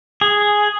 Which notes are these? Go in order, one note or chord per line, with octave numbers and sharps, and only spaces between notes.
G#4